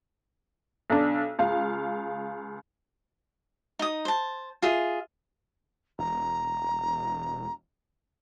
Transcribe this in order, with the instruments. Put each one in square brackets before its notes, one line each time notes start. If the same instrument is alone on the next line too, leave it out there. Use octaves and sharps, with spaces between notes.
[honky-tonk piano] B1 D4
C#2 F5
[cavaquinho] D#4 D#6
C5 A5
F4 G#4 E5
[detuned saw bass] E1 [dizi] A#5